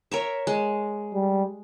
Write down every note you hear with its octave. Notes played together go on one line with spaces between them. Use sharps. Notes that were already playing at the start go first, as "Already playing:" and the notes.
A#4 C#5 E5
G#3
G3